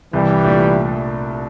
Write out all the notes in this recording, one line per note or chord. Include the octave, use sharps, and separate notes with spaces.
C2 E3 G3
A#2 A3 D4